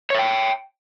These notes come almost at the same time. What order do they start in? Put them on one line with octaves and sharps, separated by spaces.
C#5 E5 G5